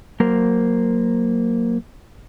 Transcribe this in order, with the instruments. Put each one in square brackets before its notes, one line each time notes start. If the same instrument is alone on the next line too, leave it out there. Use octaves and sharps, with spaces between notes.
[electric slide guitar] F#3 A#3 A#4 C5